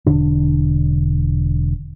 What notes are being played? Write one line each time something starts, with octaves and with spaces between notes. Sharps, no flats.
E1 D3 D4